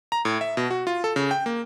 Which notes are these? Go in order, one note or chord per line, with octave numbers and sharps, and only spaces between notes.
A#5
A2
E5
B2
F#4
F4
A4
C#3
G5
A#3